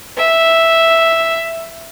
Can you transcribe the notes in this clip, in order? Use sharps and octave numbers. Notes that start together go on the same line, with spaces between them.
E5